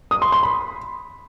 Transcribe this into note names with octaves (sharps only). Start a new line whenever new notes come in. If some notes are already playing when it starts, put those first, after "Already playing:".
D#6
C6
C6
B5